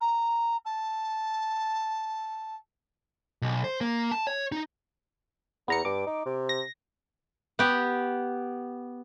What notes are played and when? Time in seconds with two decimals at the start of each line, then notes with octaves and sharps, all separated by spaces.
0.01 A#5
0.65 A5
3.42 B1
3.64 C5
3.81 A#3
4.11 A5
4.27 C#5
4.52 D#4
5.68 E2 B3 A#5 C#7
5.85 G2 D6
6.07 D#4
6.26 C3
6.49 A#6
7.59 B3 G4